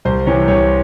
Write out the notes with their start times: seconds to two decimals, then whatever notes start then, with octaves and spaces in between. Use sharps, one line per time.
0.05 C2 C5
0.27 C3 E3 C#5
0.48 C2 C#5